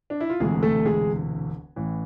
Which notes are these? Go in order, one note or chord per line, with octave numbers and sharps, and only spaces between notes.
D4
E4
F4
E1 D2 C3 E3 G#3 A3 G#4
A3 A4
G#3 G#4
A1 A2 E3